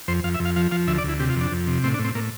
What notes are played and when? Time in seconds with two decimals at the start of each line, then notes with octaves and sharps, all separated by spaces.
0.08 F2 C5
0.24 F2 F5
0.34 E5
0.40 F2
0.45 F5
0.56 F3 F5
0.71 F3 F5
0.87 D2 E5
0.98 D5
1.04 D2 E4
1.20 C3 G4
1.30 F4
1.36 F2 D4
1.52 F2
1.67 C3
1.83 A2 C4
1.94 D4
1.99 A2
2.05 C4
2.15 A2 A#3